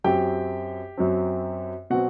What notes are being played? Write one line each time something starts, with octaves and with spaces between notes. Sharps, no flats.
F#2 F#3 C4 G4 G5
F#2 F#3 C4
B2 F#3 C4 F#4 F#5